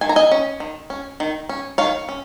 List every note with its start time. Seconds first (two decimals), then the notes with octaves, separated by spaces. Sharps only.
0.01 D#3 G#5
0.09 A#5
0.16 D#5 G#5
0.31 C#4
0.60 D#3
0.90 C#4
1.20 D#3
1.49 C#4
1.78 D#3 C#5 F5
2.09 C#4